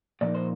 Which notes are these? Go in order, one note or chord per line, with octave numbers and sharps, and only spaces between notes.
A#2 F3 A#3 D#4 D5
C5